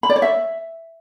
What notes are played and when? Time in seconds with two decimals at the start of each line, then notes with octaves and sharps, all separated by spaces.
0.03 B5
0.09 D5
0.16 C#5
0.22 E5